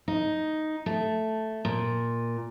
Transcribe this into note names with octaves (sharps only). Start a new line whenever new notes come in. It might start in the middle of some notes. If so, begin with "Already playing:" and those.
D#4
A3
A#2